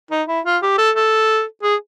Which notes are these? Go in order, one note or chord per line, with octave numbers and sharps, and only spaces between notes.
D#4
E4
F4
G4
A4
A4
G#4